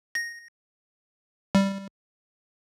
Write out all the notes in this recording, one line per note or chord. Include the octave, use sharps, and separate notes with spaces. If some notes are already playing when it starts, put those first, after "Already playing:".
A#6
G3